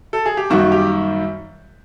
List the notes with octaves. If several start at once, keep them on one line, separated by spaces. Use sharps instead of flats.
A4
G#4
G4
F#2 D#3 G3 A#3 F#4
G4